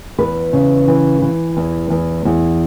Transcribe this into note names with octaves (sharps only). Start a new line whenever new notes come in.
E2 B4
C#3
E3
E3
E2
E2
E2